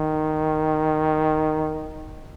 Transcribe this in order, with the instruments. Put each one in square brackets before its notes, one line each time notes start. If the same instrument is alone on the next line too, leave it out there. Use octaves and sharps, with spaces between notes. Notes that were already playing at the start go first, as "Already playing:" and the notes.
Already playing: [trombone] D#3